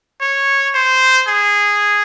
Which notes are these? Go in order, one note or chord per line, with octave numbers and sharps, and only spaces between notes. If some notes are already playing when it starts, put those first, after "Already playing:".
C#5
C5
G#4